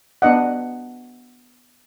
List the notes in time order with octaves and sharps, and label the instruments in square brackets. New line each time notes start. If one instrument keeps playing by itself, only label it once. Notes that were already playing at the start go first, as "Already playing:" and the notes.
[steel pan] B3 D4 D#5 F#5